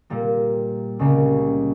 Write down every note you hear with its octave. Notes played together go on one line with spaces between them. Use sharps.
A#2 G3 A#3
C#2 C#3 G3 A#3